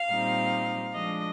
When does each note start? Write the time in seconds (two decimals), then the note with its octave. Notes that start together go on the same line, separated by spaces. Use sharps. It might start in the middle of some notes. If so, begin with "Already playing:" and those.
Already playing: F5
0.10 A#2 G3 C4 D#4
0.94 F3 G#3 D4 D#5